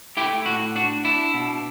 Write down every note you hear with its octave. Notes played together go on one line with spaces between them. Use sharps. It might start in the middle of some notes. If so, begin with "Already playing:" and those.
A3 E4 G4
A2 F#4
D4 F#4
D4 E4
B2